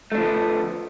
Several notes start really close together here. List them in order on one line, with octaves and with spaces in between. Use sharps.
A3 D4 F3 D3 B3